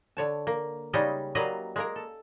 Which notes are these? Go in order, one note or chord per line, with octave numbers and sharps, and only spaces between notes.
D3 C#5 A5
A#3
C#3 G3 G#3 C#4 D#4 D#5
F#3 G3 A#3 B4 D#5 F5
G#3 A#3 A#4
A4